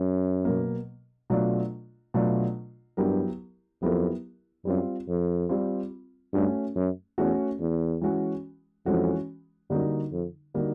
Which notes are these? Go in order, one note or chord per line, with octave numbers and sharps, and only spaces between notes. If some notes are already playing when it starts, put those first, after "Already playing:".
Already playing: F#2
B2 F#3 A#3
B2 F#3 A3 D4 F4
B2 F#3 A3 D4 F4
G2 F#3 B3 E4 G4 A#4
F2 F#3 B3 E4 G4 A#4
F#2 G3 C4 F4
F2
G3 C4 F4
G2 A3 C#4 F#4
F#2
E2 A3 C#4 F#4
E2
E3 G#3 C#4 F#4
F2 E3 G#3 C#4 F#4
F#2 D3 G3 A#3 D#4 F#4
F2
D3 G3 A#3 D#4 F#4